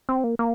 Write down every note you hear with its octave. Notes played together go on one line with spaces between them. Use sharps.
C4
A#3
A#3